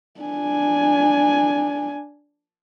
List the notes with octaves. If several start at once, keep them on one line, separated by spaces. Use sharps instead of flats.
D4 G#5